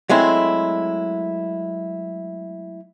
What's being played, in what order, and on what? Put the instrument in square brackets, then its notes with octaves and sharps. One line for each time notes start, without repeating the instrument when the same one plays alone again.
[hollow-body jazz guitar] F#3 G#3 A3 C4 E4